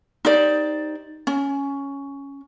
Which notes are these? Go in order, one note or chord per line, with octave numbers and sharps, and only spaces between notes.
D#4 G4 C5 D5
C#4